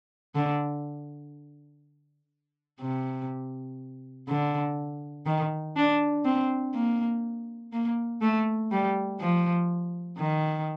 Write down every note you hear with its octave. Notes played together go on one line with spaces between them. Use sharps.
D3
C3
D3
D#3
D4
C4
A#3
A#3
A3
G3
F3
D#3